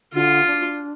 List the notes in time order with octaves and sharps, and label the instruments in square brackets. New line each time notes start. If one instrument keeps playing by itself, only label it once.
[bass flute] D3 [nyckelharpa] F4
[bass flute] D4